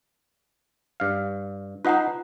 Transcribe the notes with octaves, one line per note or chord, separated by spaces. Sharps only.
G2 F5
D#4 F4 B4 F#5 A#5